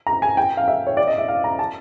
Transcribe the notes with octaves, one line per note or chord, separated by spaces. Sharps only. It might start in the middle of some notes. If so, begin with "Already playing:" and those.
A#5
G#5
G5
F5
E5
C#5
D5
D#5
E5
F5
A#5
A5